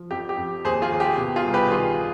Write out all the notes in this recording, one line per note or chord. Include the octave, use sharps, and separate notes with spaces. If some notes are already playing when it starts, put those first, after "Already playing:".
Already playing: F3
F2 G4
G4
F2
D#2 G#4 C5
F4 G#4
D#2
G4
B2
F4 G#4
C2
G4 B4
D#3 F4 G#4
D#3